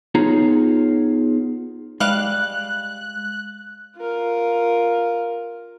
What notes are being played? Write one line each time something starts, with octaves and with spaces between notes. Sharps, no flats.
B3 D#4 F4 G#4 C#5 A#5
G3 G#3 F5 F#6
F4 A#4